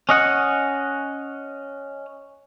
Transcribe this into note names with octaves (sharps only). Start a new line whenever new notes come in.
C#4 D#5 F#5